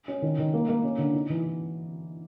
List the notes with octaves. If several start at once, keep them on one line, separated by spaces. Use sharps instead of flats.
C#4
D#3
D#3
A#3
A#3
C#4
D3
D#4
E3